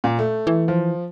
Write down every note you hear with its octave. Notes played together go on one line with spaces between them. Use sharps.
A#2
A3
E3
F3